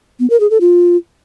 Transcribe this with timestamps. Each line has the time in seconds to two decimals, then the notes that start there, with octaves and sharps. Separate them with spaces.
0.20 B3
0.30 A#4
0.40 G#4
0.50 A4
0.61 F4